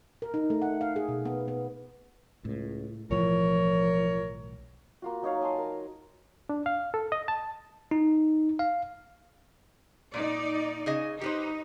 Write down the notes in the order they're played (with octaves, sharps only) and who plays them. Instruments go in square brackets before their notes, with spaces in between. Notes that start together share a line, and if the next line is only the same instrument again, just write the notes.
[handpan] A#4
D#4
A3
F#5
F5
G#4
B2
B3
B3
[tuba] C#2 [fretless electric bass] A2
[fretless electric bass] B1 A2 E3 [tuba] F3 [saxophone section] A#4 C#5
[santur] A#3 F4 F#4
F#3 D#4 C#5 F5
D#5 G#5 A5 C6
A#4
[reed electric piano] D4
F5
A4
D#5
A5
[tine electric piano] D#4
F5
[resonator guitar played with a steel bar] A#2 [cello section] D#4 D5
[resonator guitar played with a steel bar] C#3 G#4 D#5
[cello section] D#4 [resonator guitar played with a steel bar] G4 B4 C5